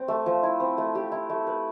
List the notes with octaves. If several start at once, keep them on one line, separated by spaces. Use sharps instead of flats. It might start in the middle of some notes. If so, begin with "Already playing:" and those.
Already playing: C4
A3
F3
E4
C4
A3
G4
E4
A3
B4